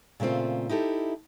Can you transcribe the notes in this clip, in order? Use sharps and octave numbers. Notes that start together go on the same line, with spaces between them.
A#2 C#3 A3 C4 F4
D#4 E4 G4 A4